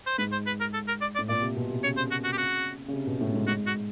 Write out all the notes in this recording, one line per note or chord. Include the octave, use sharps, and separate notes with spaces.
C5
G#2 B4
C5
B4
A#4
A4
A#4
D5
D5
A2
A#2 D5
C3
B2
C3
C#3 C#5
C5
F#4
F#4
G4
F#4
C#3
C3
B2
A2
G#2
G#2 F#4
F#4